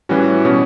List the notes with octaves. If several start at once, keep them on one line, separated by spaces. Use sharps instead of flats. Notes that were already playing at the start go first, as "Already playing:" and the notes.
A2 E3 G3 C#4 F#4
B2 G3 C#4